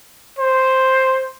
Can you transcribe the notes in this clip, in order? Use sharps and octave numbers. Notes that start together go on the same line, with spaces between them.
C5